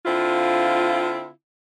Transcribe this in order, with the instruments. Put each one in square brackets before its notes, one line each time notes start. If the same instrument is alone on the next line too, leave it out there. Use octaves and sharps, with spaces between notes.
[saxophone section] D3 C4 E4 F4